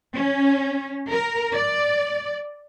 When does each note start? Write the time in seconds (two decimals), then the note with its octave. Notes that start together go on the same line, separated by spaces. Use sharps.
0.15 C#4
1.11 A#4
1.54 D5